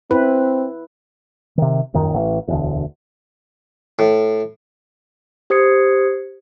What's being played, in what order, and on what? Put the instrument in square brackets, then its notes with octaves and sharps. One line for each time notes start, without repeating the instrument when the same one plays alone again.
[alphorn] C4 [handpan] E4 B4
[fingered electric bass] C3 D#3
D#1 F#2 D#3
A1
E1 D2
[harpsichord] A2
[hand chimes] G4 C5 D#6 G#6 C7 C#7